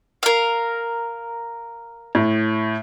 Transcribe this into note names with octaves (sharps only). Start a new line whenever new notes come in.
A#4 F5
A2